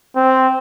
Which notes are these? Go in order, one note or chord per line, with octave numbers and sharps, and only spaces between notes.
C4